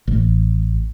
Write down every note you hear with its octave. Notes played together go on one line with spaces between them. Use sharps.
A1